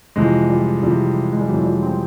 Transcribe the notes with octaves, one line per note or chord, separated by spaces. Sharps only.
F2 C3 E3 G#3
G3
F2 C3 E3 G3
G#3
G3
F2 C3 E3 F#3
G3
C4